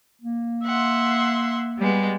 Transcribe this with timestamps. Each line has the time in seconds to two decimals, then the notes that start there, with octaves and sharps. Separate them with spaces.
0.22 A#3
0.64 E5 F#5 C6
1.78 G3 G#3 B3